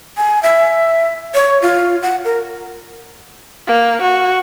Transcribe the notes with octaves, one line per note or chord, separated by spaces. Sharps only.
G#5
E5
C#5
F4
F#5
A#4
A#3
F#4